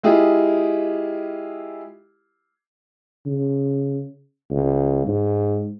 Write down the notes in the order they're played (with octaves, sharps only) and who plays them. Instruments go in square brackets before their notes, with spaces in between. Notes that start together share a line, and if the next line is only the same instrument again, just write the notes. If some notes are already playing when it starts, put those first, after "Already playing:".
[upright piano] G#3 E4 F4 G4 G#4
[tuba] C#3
C#2
G#2